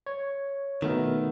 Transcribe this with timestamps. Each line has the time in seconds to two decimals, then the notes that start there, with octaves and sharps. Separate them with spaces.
0.06 C#5
0.82 B2 D#3 A3 B3 A#4